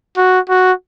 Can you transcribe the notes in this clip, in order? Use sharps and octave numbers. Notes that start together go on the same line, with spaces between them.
F#4
F#4